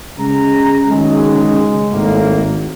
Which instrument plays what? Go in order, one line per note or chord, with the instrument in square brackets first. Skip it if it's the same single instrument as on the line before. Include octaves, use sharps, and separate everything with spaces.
[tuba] C#3 [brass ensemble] G#3 A#5
[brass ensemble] D#3 F#3 [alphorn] G#3
[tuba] G#1 [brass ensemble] A2 A#3